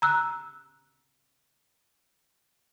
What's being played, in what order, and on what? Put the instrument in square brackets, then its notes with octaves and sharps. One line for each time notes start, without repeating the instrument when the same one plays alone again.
[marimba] A#5 E6 F#6